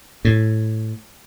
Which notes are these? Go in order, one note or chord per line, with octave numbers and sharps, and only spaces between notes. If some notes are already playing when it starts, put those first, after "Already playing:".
A2